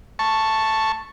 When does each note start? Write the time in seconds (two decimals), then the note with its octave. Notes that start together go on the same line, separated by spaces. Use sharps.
0.19 A5 C#6